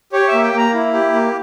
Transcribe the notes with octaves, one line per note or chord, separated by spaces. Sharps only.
G4 C#5
E5
A#3
G5
A#3 A#5
E4
G4
A#3